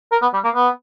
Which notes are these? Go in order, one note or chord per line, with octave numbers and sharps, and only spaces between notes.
A#4
B3
G3
A#3
B3